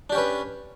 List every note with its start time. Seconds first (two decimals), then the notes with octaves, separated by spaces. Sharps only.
0.10 D4
0.12 G4
0.15 C#4
0.18 B4